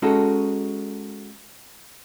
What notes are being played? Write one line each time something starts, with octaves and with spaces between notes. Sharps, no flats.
G#3 C#4 D#4 F#4 A4